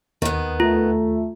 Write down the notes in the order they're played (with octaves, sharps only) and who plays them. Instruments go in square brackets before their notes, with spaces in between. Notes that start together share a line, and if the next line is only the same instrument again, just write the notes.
[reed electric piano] D#2 [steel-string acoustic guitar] D#3 B3
[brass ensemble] A3 [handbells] F4